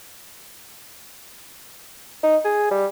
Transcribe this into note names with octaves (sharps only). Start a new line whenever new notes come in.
D#4
G#4
G3